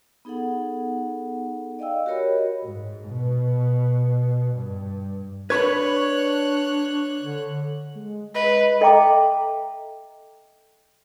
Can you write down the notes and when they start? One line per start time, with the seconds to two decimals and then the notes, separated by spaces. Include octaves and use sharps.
0.25 B3 D#4 G#4 A4 F#5
1.79 D5 D#5 F5 G5 E6
2.06 F#4 G4 A#4 C#5 D#5 B5
2.64 G#2
3.08 B2
4.55 G2
5.50 D4 B4 C#5 B5 C#6 F#6 G#6
7.21 D3
7.95 G#3
8.35 B4 D#5
8.81 A4 D#5 E5 G5 A#5 D6